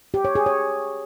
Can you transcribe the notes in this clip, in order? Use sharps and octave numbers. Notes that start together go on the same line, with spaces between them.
G4
C#5
G#4
C#5